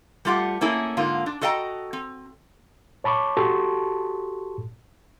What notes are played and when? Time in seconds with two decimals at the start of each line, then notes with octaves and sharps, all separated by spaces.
0.25 G3 A3 F4 G4 F#5
0.61 A3 A#3 C#4 E4 G#4
0.97 G#2 D3 A#3 F4
1.26 D4
1.41 F#4 A4 D#5 E5 G5 A#5
1.93 C4
3.04 C#5 A5 B5 C#6 D6
3.37 F#4 G4 A4 A5 C6 C#6